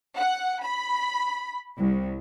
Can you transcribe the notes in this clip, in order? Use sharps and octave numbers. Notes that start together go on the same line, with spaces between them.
F#5
B5
C2